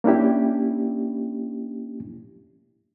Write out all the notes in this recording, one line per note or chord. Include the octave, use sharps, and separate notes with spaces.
A#3 C#4 D4 E4 G4